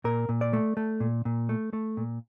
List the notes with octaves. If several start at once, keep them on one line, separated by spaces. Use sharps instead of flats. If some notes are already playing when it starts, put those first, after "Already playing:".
A#2 A#4
A#2
D5
A3
A3
A#2
A#2
A3
A3
A#2